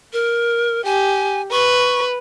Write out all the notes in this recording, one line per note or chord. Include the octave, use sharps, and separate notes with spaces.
A#4
G4 G#5
B4 C#6